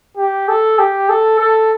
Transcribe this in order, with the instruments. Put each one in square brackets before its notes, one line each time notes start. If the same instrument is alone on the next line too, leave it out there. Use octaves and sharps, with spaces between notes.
[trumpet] G4
A4
G4
A4
A4